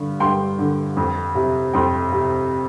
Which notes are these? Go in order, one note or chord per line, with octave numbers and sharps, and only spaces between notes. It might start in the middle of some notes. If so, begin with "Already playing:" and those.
Already playing: G2 D3
G2 G5 C6
D3
F2
C3
F2 G5 C6
C3